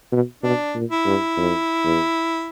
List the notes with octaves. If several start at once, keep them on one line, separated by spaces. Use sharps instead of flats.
B2
B2 D4
A#2
E4
G2
F2
E2